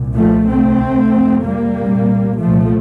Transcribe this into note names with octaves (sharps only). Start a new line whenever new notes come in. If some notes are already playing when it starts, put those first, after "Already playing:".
Already playing: C2 A#2
F3 A3
D2 C3 A3 C4
F2 C3
G3 A#3
C2 A#2
C2 A#2 F3 A3